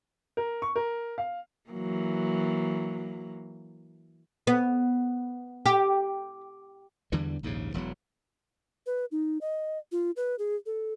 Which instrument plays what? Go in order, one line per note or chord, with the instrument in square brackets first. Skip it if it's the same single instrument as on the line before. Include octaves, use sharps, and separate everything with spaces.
[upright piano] A#4
C#6
A#4
F5
[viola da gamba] E3 F#3 A#3
[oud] B3
G4
[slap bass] E2 D3 E3 G3
A#1 D#2 G#2 C#3
E1 E2 F3 F#3
[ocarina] B4
D#4
D#5
F4
B4
G#4
A4